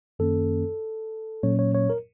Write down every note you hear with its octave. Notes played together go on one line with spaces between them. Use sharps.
F#2 D#3 A#3 C#4 A4
A#2 F#3 A#3 C#4 C#5
C#5
C#5
A#4